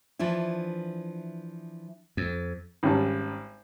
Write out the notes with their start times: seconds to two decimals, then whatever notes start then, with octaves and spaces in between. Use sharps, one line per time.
0.19 E3 F3 D4 E4
2.17 F2
2.83 G#1 C#3 G3 A5